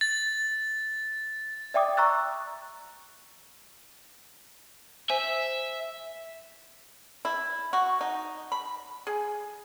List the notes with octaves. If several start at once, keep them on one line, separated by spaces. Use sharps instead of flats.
A6
D5 E5 G5 D6 D#6
A#5 C#6 E6 F#6 A6
C5 E5 G#5
E4
F#4
D#4
B5
G#4